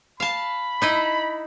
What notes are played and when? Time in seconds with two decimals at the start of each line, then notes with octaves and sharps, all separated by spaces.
0.20 F5 A5 B5
0.82 D#4 E4 D#5